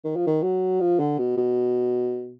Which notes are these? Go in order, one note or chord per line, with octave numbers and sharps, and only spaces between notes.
D#3
F3
D#3
F#3
F3
D3
B2
B2